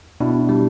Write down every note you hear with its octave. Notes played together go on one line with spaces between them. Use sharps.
B2 D4 E4
G3